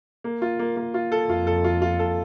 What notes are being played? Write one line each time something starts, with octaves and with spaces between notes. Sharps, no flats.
A#3
F4
A#3
A#3
F4
A4
F2 F4
A4
F4
F4
A4